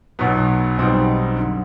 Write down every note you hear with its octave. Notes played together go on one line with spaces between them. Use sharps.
B1 B2 F#3 B3
B1 B2 G3 C4 D#4
F#2 D3